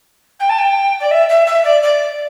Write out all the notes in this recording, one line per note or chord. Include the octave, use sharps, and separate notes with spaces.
G5
A5
G5
D5
E5
E5
E5
D5
D5